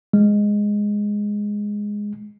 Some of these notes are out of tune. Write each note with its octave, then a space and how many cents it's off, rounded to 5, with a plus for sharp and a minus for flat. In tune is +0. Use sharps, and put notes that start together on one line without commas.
G#3 -5